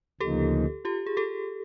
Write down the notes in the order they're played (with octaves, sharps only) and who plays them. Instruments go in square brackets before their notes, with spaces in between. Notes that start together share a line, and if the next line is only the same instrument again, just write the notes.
[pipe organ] D2 C#3 F3 A#3 D#4 [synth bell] G4 A4
[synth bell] F4 G4
G#4
G4 A4